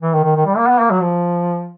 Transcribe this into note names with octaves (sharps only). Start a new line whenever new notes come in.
E3
D#3
D#3
D#3
G3
A#3
B3
A#3
F#3
F3